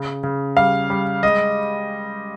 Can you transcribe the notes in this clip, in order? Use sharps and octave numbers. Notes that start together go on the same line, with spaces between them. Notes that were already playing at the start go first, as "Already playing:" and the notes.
Already playing: C#3
C#3
G3 F5
G3
G#3 D#5